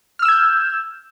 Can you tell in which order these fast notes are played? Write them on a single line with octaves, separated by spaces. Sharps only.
F6 E6 E7 G#6 G6